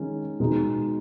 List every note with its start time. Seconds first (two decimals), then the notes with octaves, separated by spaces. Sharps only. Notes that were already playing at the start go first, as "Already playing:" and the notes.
Already playing: D#3 G#3 C#4
0.40 B2 G#3 D#4